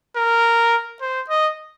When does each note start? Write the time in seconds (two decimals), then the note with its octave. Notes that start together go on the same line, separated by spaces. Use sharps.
0.16 A#4
1.01 C5
1.29 D#5